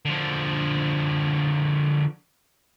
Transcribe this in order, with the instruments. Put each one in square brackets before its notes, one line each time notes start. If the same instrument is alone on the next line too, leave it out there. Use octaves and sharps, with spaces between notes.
[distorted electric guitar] D3 F3